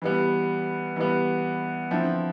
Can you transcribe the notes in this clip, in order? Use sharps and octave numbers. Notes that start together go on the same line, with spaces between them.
E3 G3 B3
E3 G3 B3
D3 F3 C4 E4